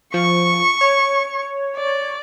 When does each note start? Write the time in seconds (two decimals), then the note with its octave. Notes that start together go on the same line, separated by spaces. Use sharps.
0.14 F3 C#6
0.81 C#5
1.77 D5